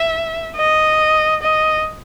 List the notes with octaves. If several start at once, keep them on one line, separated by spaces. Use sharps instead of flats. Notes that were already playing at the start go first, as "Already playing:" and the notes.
Already playing: E5
D#5
D#5